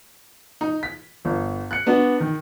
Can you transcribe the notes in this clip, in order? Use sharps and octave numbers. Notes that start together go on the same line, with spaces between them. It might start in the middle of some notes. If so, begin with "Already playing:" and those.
D#4
B6
G1
F#6 C#7
B3 D4 F#4
D#3